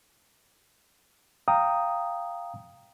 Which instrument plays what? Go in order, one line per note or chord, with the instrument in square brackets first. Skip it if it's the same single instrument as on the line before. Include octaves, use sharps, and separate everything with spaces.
[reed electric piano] F5 G5 A#5 D#6